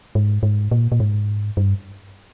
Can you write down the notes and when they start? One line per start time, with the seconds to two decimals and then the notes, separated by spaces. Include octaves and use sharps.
0.15 G#2
0.43 G#2
0.71 A#2
0.92 A#2
1.00 G#2
1.57 G2